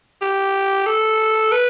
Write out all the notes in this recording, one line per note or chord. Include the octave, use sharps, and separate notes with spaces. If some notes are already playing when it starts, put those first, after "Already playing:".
G4
A4
B4